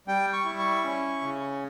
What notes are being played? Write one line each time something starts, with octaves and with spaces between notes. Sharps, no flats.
G3 G5
C#6
E4
C#6
C#4
C#3